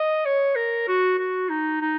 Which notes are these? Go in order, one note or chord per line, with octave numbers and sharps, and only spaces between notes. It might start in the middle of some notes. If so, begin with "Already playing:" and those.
Already playing: D#5
C#5
A#4
F#4
F#4
D#4
D#4